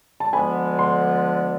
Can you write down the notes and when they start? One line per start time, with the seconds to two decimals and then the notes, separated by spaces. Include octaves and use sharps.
0.20 A5
0.32 D2 D3 F3 G#3 B3 G#5 B5
0.79 C6